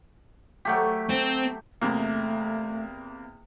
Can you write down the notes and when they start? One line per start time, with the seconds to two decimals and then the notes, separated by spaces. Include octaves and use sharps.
0.65 F#3 A3 G4
1.09 C4
1.81 E2 C3 A3 A#3